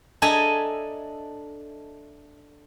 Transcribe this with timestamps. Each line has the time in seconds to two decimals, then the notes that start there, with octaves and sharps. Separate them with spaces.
0.22 D4 A4 D#5 E5 G#5 A#5